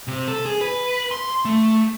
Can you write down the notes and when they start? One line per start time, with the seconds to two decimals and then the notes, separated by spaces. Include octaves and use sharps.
0.07 C3
0.28 A4
0.46 G#4
0.61 B4
1.11 C6
1.45 A3